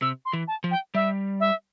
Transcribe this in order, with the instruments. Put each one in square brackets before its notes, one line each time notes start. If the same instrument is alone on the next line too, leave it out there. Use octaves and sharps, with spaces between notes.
[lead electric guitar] C3 [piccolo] E6
[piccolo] C6
[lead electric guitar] E3
[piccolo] A5
[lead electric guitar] F3
[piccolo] G5
[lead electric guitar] G3 [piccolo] E5
[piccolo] E5